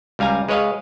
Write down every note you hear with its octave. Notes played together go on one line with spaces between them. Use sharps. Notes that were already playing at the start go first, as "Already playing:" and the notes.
C#2 G3 F5 G#5 A#5
G#3 B4 C#5 D#5 F5